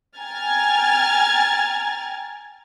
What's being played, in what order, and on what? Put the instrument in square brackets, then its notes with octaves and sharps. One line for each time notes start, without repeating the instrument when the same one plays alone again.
[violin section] G5 G#5 A#5 F6 G#6 A6